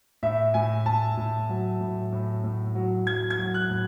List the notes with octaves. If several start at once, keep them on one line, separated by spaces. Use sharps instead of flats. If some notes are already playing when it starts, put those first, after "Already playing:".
A2 E5
A2 G#5
A2 A5
A2
F#3
A2
A2
A2
F#3
F#3 G#6
G#6
F#3
F#6
A2